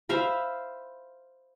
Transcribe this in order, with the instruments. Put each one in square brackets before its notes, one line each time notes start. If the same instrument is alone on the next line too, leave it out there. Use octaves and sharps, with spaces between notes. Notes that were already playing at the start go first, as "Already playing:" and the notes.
[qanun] C5 E5 F5 B5